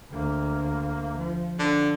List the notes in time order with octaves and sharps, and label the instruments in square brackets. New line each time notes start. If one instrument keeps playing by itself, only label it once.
[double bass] D2 A#3
F3
[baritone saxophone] D3